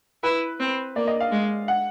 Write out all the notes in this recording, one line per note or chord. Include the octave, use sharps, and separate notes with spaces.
E4 B4
C4
A#3 D5
D#5
F5
G#3
F#5